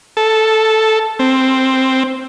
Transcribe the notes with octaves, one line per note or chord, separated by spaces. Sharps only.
A4
C4